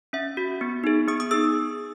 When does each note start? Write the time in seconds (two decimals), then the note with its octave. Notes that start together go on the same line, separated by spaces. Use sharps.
0.13 C#4 E5
0.37 F#4
0.61 B3
0.84 D#4 G#4
1.08 B3 D#6
1.20 D#6
1.31 D#4 G#4 E6